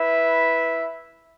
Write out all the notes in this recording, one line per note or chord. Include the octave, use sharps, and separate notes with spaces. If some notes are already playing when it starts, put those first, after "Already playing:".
Already playing: E4 B4 E5